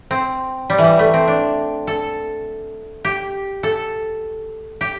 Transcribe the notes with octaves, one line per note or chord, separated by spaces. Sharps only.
C4
G3
E3
G3
A3
C4
D4
A4
G4
A4
G4